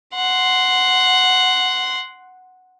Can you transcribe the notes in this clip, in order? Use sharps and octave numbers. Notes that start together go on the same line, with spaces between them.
F#5 C6